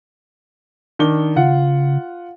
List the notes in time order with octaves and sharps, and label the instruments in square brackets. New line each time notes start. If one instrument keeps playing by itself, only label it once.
[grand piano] D#3 D4 G7
[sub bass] C#3 [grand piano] F4 F#5